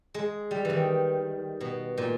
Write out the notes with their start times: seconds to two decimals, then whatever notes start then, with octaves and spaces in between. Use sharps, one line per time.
0.14 G#3
0.51 G3
0.65 D#3 E3
1.61 B2
1.98 A#2